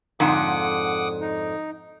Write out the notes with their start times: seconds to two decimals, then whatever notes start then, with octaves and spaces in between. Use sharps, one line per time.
0.20 F2 G#2 D3 F#5 D6 D#6
1.21 D#4